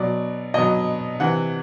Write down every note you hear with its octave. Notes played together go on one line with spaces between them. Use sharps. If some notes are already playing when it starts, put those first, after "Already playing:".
Already playing: B2 F#3 D5
B2 F#3 D#5
C3 E3 F#5